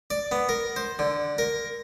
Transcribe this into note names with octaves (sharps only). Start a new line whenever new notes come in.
D5
B3
A#4
C5
D3
A#4